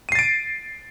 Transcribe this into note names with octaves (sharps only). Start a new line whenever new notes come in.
A6 C7 D7 D#7